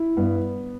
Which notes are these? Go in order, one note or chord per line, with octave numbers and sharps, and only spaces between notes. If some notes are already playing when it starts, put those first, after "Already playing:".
Already playing: E4
G2 B3